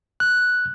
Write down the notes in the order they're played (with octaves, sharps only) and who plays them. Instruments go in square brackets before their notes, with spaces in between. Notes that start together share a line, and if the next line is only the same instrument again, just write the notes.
[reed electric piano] F#6